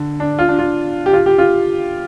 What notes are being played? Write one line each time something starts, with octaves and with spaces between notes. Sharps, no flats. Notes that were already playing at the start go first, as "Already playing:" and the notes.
Already playing: D3
D4
F4
D4
F4
G4
F4
G4
F4